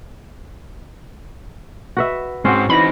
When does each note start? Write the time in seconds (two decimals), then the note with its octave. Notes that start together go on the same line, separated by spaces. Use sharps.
1.97 F#4 B4 E5
2.45 G#2 C4 C#4 F#4
2.70 E3 C4 D#4 B5 A#6